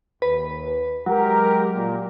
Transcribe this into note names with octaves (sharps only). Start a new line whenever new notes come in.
D#2 B4
F#3 G#3 G4 A#4
A#2